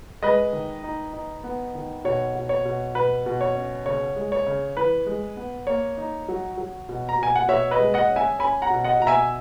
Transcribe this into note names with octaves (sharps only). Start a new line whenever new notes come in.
G#3 B4 D#5
D#3
D#4
D#4
B3
D#3
B2 C#5
B2
C#5
B2
B2 B4
B2
C#5
C#4
C#3 C#5
G#3
C#5
C#3
E3 B4
G#3
B3
A#3 C#5
D#4
F#3
F#3
B2
A#5
B2 G#5
F#5
B2 C#5 E5
B4 D#5
G#3
D#5 F#5
C#4
E5 G#5
C#4 G#5 B5
F#5 A#5
B2
D#5 F#5
B2 A#5
E5 G#5